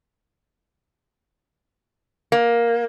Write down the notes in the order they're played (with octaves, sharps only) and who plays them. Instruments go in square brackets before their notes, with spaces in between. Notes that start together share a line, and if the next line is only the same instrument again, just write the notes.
[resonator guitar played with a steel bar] A#3